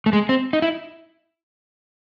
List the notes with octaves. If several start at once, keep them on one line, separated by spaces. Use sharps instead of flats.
A3
G#3
C4
D#4
E4